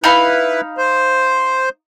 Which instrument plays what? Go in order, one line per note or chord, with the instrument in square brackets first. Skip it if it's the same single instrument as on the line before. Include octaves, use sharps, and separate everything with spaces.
[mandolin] D#4 F5 B5 [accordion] E4 B4
[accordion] C5